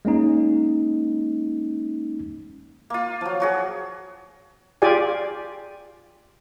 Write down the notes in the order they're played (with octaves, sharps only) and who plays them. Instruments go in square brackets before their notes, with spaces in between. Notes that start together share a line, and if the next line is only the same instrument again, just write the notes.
[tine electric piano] G#3 A#3 C#4 D#4
[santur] A#3 F4
F3 F#3
F#3 F#4 G#4
[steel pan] F4 G4 G#4 D5 G#5